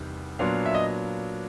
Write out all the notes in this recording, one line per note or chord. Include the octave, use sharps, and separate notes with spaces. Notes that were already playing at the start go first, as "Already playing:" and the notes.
Already playing: E2 C3 D#3 G3
A#2 F#3 B3 D4 F4 F5
E5
D#5